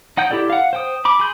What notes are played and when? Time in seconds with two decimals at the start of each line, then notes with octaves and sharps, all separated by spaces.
0.17 D#4 F#5 G5 G6
0.31 E4 G4 A4 D5
0.50 F5 F#5
0.73 C5 G5 D#6
1.05 B5 D6
1.20 G#4 B5 C6 G6